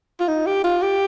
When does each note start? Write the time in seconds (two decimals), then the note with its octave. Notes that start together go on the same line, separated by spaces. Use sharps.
0.20 F4
0.28 D#4
0.46 G4
0.64 F4
0.82 G4